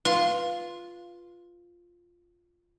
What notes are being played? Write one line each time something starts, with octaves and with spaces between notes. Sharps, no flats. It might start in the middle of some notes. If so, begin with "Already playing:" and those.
F4 B4 F5